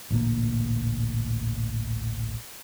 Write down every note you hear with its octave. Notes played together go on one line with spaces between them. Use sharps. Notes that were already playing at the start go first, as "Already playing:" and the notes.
A1 D2 A#2 A#3